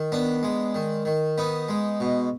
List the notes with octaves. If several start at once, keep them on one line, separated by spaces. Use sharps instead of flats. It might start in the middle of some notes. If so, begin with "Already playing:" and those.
Already playing: D#3
B3 D4
G#3
D#3
D#3
B3 D#4
G#3
B2